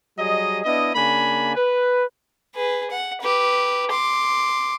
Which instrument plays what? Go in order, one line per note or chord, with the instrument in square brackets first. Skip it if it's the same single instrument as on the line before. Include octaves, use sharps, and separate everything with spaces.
[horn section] F#3 G3 G#4 D#5
B3 D4 E4 D#5
C#3 A#3 D4 G#5 B5
B4
[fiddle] G#4 B4
F#5
G4 B4
C6 D6